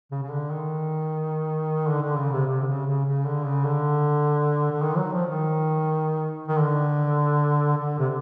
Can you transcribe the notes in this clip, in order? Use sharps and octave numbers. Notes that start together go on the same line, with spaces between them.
C#3
C#3
D3
D#3
D3
D3
C#3
C3
C3
D3
C#3
C#3
C#3
D3
C#3
D3
D3
D#3
F#3
F3
D#3
D#3
D3
D3
C3